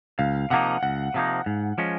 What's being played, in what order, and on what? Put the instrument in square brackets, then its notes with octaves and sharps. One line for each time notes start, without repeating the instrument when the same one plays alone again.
[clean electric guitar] C#2 [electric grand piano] F5
[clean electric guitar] C3 F3 A#3 D#4 [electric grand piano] F#5
[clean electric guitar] C#2 [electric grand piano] F#5
[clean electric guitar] C3 F3 A#3 D#4
G#2
F3 G#3 C#4